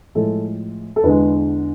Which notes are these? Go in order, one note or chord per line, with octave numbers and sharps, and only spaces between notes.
A2 F3 G#3 A4
A4
E2 D3 G#3 B4